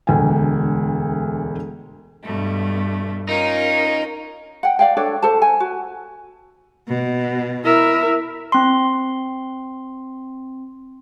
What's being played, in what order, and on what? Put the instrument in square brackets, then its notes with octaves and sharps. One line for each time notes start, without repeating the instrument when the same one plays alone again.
[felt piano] E1 D2 G#3 G5 G#5
[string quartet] G2 B2 A3
[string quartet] C#4 F4 A#4 [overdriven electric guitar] D#4
[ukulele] F#5 G5
D5 F5 G5
D4 A4 C#5 D5
A4 C5 A5
G#5
F#4
[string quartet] B2
[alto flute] E4 [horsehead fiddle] A#4 E5
[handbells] C4 C6